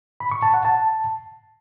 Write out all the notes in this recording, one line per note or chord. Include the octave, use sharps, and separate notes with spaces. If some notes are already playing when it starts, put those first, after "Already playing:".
B5
C#6
A5
F#5
A5